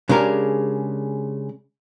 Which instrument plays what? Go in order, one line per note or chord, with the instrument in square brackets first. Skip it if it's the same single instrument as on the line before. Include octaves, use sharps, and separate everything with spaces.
[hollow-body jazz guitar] C#3 G#3 D4 G4 A#4